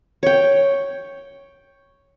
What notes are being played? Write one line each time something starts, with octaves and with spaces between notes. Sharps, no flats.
C#5 G5